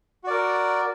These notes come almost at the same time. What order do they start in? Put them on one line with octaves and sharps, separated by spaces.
F#4 D5 A#4